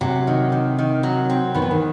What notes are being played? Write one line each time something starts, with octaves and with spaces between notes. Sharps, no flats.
C3 F#3
D#3
D#3
D#3
F#3
C4
D#3 B3
E3
D#3